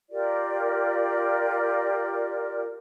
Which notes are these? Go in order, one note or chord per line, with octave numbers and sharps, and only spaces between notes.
F4 G4 A#4 D5